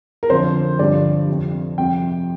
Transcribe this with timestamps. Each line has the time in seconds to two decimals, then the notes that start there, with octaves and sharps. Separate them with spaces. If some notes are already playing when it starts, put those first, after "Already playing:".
0.23 A#4
0.29 F2 D3 F3 C5
0.79 G2 D3 F3 D5
1.28 F2 C3 F3
1.78 F2 C3 F3 G5